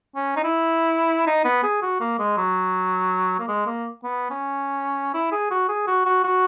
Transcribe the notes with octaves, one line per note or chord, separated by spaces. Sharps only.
C#4
D#4
E4
D#4
B3
G#4
F#4
A#3
G#3
F#3
A#3
G#3
A#3
B3
C#4
E4
G#4
F#4
G#4
F#4
F#4
F#4